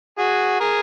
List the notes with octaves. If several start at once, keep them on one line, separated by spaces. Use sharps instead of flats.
F#4 G#4
G#4 A#4